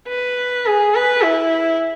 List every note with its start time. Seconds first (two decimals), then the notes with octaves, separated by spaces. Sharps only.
0.08 B4
0.66 G#4
0.95 B4
1.24 E4